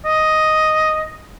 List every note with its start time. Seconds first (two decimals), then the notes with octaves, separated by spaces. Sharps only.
0.05 D#5